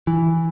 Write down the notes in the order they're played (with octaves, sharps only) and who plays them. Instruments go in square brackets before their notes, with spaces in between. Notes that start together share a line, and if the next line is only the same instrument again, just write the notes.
[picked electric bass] E3